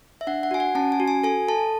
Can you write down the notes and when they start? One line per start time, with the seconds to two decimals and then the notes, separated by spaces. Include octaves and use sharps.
0.21 E5
0.27 D4 F#5
0.43 F#5
0.51 F#4 G#5
0.60 F#5
0.75 C#4 A5
0.92 G#5
1.00 F#4
1.08 G#5
1.24 A4 G#5
1.48 A4 A5